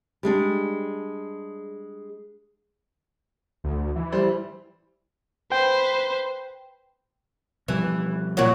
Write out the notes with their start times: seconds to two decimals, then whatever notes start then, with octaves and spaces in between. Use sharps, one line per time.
0.23 G3 G#3 D4
3.64 D2
3.96 E3
4.12 G3 C5
5.52 B4 C5 G5
7.68 B2 E3 F3 G3
8.37 A#2 F#3 F#4